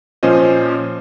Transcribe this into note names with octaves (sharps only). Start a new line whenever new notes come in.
A#2 F3 C#4 C5 D#5